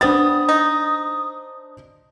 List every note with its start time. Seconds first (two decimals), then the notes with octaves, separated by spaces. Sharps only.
0.01 G3 B3 D4 C5 D#6 A6
0.49 D#4